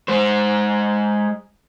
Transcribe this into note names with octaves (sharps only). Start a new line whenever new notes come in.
G#3 C5